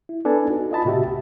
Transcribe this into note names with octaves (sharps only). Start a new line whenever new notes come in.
E4
B3 D4 A4 B4 G#5 A5
D#4 F#4
F4 D#5 A5 B5
A2 C3 F#4 G4 E5
C2